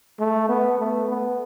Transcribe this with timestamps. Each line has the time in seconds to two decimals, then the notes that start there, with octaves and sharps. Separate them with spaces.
0.19 A3
0.49 B3
0.79 A3
1.09 B3